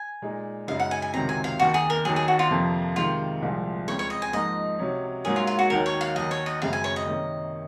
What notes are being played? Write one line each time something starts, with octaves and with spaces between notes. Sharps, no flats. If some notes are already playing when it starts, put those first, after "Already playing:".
Already playing: G#5
A#2 G#3 D#4
F#2 C#3 G#3 D#4 F5
F#5
G#5
G#5
C#2 C3 D#3 F#3 C4 A#5
G#5
F5
D#2 D#3 A#3 F#4
G#4
A#4
D#2 D#3 F#3 G#4
G#4
F#4
F4
F2 C3 F3 A#3
C3 D#3 G#3 F4
C2 A#2 F3 G#3
C#2 C#3 G#3 C4 C#5
C#5
D#5
G#5
G#2 F3 A#3 D#4 D#5
C3 F#3 C#4
G#2 F#3 A#3 C#4 G#4
F4
F4
F#4
D#2 D#3 F#3 A#4
C#5
F5
D#2 D#3 F#3 D#5
C#5
D#5
F#2 C#3 G#3 C4 F5
G#5
C#5
D#5
C3 D#3 A#3 C#4